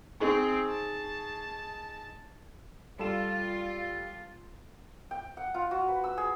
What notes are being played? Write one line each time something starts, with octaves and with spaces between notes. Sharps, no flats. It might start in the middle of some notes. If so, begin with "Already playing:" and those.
C4 D#4 G#4 C#6
A5
G3 F4 A4 E7
G5
F#5
F4
F#4
B4
E6
G#4